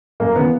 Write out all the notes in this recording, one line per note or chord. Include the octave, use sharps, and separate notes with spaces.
F#2 A#3
C#3 E3 B3